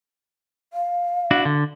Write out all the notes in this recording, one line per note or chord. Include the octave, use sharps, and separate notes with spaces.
F5
D4 E4 F#4
D3